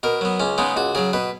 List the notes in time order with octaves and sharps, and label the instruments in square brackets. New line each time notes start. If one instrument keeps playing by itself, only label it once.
[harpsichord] B2 A#4
F#3 B3
C#2 C#4
C#3 G#3 B3 D#4
C#2 F#4
C#3 F#3 G#4
B2 B4